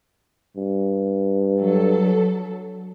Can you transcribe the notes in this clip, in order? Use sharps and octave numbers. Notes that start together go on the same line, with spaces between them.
G2
F#3 A4